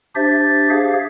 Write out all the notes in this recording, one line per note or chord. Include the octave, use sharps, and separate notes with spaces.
D4 G4 C5 E5 A6
G4 G#4 F5 G#6